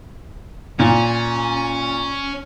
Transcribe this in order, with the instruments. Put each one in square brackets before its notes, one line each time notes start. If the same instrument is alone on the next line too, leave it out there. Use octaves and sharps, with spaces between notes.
[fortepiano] A#2 [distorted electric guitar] C#4